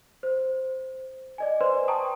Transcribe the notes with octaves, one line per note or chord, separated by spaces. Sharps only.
C5
D5 D#5 G#5
B4 C5 D5 C6
G5 A5 A#5 C#6 D#6